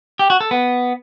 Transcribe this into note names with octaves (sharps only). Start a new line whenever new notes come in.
G4
F#4
A4
B3